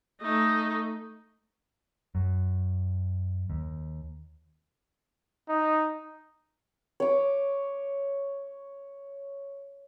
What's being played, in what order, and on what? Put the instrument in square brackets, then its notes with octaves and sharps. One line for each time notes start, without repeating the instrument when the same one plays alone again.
[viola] A3 D#4
[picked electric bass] F#2
D#2
[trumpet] D#4
[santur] C#5 D6